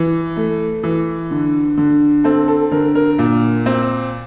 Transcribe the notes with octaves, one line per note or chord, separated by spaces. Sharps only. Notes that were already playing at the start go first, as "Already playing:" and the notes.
Already playing: E3
A3
E3
D3
D3
C4 A4
A4
D3 A#4
A#4
A#2
C4